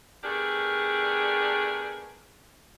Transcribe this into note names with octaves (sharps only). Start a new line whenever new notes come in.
A3 B3 D4 G4 G#4 A#4